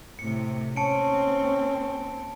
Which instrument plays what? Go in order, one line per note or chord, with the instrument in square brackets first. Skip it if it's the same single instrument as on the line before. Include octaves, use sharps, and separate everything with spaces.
[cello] A2 C3 [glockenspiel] C#7
[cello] D#2 C4 [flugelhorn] C#4 [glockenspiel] A5 C#7 D7